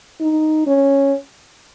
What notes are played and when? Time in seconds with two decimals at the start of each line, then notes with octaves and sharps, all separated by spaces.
0.21 D#4
0.67 C#4